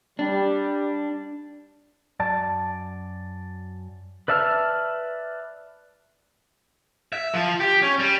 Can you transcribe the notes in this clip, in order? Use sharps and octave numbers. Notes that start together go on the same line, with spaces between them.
G3 D4
F#2 D5 A5
B4 D5 E5 A5 F6
E5
F3
G4
C#4
G3